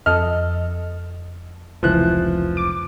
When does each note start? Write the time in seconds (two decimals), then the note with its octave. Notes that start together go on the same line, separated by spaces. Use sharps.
0.06 F2 A4 D#5 F6
1.83 F1 C#2 E3 F3 F#6
2.57 D6